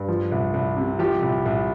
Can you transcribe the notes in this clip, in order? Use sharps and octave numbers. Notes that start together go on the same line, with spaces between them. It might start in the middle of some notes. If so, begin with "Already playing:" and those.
Already playing: G2
F3
C2
C2
C3
F3 G4
C2
C2